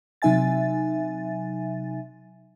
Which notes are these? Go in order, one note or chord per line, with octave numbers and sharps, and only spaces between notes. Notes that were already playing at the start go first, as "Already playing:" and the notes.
C3 F#3 D#4 E5 G#5 A6